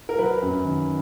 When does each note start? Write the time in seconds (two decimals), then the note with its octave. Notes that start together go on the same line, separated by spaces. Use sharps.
0.09 A#4
0.19 F#3 B4
0.42 F#2
0.65 D#3